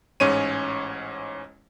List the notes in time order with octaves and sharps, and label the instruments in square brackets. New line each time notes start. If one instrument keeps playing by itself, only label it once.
[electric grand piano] A1 G#2 C#4 C#5 D#7